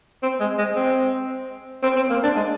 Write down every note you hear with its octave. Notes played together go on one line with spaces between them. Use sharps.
C4
G#3
G#3
C4
C4
C4
A#3
D4
G#3